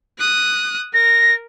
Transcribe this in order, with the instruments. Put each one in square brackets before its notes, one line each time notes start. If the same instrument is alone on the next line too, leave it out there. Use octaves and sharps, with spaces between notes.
[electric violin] D#6 F#6
[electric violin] A#4 [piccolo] A#6